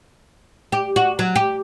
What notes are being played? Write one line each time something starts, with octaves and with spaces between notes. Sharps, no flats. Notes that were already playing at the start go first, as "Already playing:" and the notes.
G4
F#4
F#3
G4